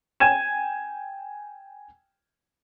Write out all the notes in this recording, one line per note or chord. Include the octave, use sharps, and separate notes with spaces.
G5 G#5 G#6 D#7 E7